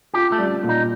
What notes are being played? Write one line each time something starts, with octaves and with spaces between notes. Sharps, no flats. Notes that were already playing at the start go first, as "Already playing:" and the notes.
F4 G4
A3
G3
A#2
D#4